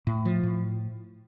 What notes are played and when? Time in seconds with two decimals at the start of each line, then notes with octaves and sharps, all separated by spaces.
0.07 A2
0.25 F3
0.43 A2